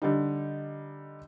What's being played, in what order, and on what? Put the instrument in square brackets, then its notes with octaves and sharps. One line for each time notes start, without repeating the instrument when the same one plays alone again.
[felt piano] D3 G3 D#4